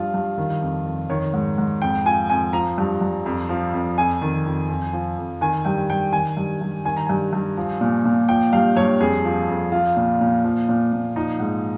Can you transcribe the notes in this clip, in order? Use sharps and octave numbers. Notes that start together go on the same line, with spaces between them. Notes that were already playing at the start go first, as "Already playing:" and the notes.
Already playing: G2 F3 F4
G2
D#3
F2
F2
D#3 C#5
G#2
G#2
F2 G5
F3 G#5
F2 G#5
F3 A#5
G2
G2
F2
F3
F2
F2 G#5
D#3
F2
F2
F3
F2
D#3 G#5
G2 G5
G2 G5
D#3 G#5
G2
G2
D#3 G#5
A#5
G2 G#5
G2
F3
A#2
A#2
F3 G5
G2 F5
G2 C#5
F2 G#4
F3
F2
F3 F4
A#2
A#2
F3
A#2
A#2
F3 D#4
G#2